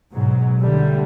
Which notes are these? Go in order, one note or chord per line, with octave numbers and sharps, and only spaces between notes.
G#2 B2 F#3
C2 D3 G3 A3